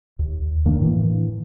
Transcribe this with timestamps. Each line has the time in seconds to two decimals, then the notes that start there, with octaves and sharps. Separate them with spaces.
0.19 D#2
0.65 F#2 D#3 A#3 D4
0.80 A2 E3